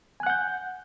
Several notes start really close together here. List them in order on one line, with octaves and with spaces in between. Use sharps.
G#5 F#6 F#5 G6